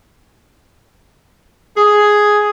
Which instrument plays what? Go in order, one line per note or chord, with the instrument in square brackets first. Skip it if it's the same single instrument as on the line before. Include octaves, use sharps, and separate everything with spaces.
[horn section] G#4